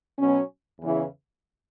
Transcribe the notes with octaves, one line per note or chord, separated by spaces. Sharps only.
B2 F#3 C#4
E2 C#3 E3